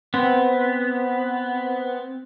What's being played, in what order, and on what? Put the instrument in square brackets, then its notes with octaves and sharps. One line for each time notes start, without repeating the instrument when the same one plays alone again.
[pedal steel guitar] B3 [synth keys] C4